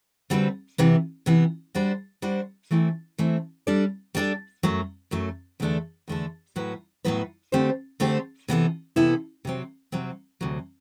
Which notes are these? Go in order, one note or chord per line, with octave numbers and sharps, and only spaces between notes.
D3 G3 C4 F#4 B4
C3 E3 B3
C3 E3 B3
G3 D4 F#4 C5
G3 D4 F#4 C5
E3 A3 C4 E4
E3 A3 C4 E4
G3 D4 A4 D5
G3 D4 A4 D5
F#2 F#3 A3
F#2 F#3 A3
E2 D3 A3 D4 A4
E2 D3 A3 D4 A4
A2 F#3 B3 F#4 B4
A2 F#3 B3 F#4 B4
D3 A3 C4 G4 C5
D3 A3 C4 G4 C5
C3 E3 B3 E4 A4
C3 E3 B3 E4 A4
C3 F#3 C4
C3 F#3 C4
D2 C3 F#3